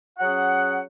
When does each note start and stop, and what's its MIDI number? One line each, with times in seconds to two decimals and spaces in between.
0.19 0.80 54
0.19 0.80 61
0.19 0.80 68
0.19 0.80 78